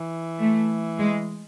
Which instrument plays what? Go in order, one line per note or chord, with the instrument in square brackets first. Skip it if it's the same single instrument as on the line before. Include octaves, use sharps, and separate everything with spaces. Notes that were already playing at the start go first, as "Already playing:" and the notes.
Already playing: [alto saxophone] E3
[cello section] A3
G#3